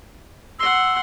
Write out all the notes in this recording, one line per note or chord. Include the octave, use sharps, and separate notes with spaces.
F#5 C6 E6